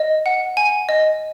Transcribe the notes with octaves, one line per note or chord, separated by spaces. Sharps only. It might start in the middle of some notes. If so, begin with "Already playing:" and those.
Already playing: D#5
F#5
G#5
D#5